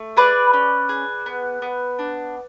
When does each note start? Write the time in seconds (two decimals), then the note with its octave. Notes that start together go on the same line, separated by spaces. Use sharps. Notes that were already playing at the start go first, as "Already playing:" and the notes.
Already playing: A3
0.17 G#4 B4 D5
0.53 C#4
0.89 G#4
1.26 B3
1.62 B3
1.99 D4